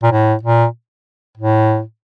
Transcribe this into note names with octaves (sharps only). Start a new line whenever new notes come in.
A#2
A2
A#2
A2